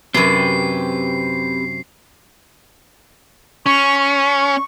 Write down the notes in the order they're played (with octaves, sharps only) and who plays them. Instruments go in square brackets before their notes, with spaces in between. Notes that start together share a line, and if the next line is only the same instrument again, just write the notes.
[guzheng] F#2 C3 [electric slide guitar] C4 G4 B4 [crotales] C7
[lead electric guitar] C#4 [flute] C#6
[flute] C#6